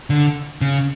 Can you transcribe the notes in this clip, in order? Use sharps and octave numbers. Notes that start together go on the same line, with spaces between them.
D3
C#3